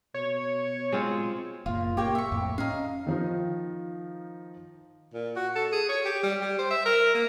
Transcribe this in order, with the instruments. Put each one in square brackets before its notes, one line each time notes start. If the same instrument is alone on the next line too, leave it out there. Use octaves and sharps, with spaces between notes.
[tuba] B2 [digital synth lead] C#5
[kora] G#3 C4 F4
[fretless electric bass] F#1 A#2 [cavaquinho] F4
[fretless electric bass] A#3 [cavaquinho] G4 C#5 G5
[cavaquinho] E5 C#6
[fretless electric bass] F2 A2
[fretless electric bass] C#4 [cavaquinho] D#4 F5
[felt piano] D#3 F3 D#4
[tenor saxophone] A#2
F#4
A4
G#4
C#5
G4
G3
G3
C5
E5
A#4
A#3